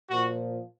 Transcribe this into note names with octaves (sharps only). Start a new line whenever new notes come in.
A#2 F3 F#4